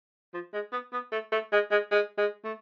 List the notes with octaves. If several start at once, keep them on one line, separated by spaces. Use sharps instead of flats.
F3
G#3
B3
B3
A3
A3
G#3
G#3
G#3
G#3
A3